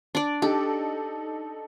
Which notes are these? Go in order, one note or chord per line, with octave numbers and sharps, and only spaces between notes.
D4 D5
D4 D#4 G4 A4